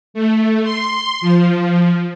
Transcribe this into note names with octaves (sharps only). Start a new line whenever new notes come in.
A3
C6
F3